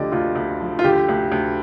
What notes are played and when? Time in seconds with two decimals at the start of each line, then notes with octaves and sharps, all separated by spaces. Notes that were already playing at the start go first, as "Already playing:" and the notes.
Already playing: D2 D3 F3 G4 D5 D#5
0.12 D2 F4
0.35 D2
0.60 F3
0.79 F4
0.84 D3 G4
1.09 D2
1.32 D2